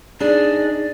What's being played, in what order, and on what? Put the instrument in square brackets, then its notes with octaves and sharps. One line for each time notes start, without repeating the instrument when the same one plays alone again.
[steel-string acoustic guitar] D4 D#4 G#4 [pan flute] D5